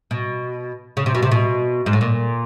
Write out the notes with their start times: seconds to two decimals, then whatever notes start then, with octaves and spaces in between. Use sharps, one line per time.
0.11 B2
0.97 C#3
1.06 C3
1.15 B2
1.22 C3
1.31 B2
1.86 G#2
1.93 A2
2.01 A#2